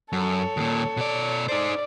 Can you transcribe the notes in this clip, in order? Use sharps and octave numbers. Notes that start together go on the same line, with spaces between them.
F#2 A4 C#5
D#2 A#2
B2 D5
D#4 C5 D5